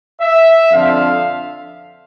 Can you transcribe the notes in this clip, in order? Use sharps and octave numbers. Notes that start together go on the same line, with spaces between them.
E5
F2 D3 F3 F5